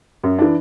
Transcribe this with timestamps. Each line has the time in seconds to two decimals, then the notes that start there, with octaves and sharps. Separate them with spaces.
0.23 F#2
0.39 E3 D4